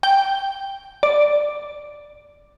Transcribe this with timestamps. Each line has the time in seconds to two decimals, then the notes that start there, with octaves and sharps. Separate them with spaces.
0.03 G5
1.03 D5